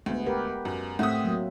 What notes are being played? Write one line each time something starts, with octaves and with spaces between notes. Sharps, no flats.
D2 G#3 B3
G4 A#4 B4
F#2
A2 C4 E5 F#5 D#6
F#3 A#3